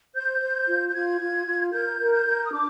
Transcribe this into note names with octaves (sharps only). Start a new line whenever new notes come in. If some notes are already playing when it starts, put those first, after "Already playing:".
C5 G6
C5
F4
G6
F4 G#6
F4
F4
A#4 G6
A#4
G6
A#4
D#6
D4 D6